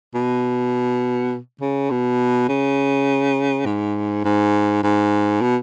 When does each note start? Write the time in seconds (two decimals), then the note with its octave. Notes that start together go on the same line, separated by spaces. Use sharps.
0.15 B2
1.61 C#3
1.90 B2
2.49 C#3
3.65 G#2
4.25 G#2
4.83 G#2
5.41 B2